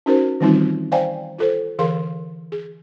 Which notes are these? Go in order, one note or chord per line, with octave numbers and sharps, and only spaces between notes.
C#4 D#4 F#4 A#4 C5
D#3 E3 G3 C4 D#4 F4
C5 D5 F5 G5 G#5 A#5
F4 A4 C5
D3 E3 G#4 A#4 F5 C6
G#4